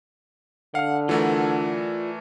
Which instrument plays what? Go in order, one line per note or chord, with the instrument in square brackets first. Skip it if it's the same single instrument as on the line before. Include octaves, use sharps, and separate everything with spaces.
[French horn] D3 [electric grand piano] F5 F6 [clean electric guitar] F#5
[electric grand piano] E3 A3 A#4 [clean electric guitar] F4 D5 F#5